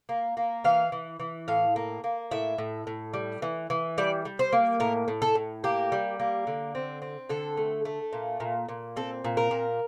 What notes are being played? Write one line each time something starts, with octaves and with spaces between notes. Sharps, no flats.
A#3
A#3
E3 F5
E3
E3
A2 F5
A#3
A#3
A2 E5
A2
A2
G3
E3
E3
G3 D5
G3
C5
A#3
A2 A#4
A2
A4
A2
A#3 G4
G3
A#3
D3
C4
C4
D3 A4
A3
A3
A#2
A#2
A#2
C4 A4
A#2
A#4
A#2